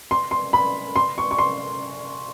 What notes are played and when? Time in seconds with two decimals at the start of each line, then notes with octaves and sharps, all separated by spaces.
0.11 C6
0.31 C6
0.53 B5
0.96 C6
1.18 C#6
1.31 C#6
1.39 C6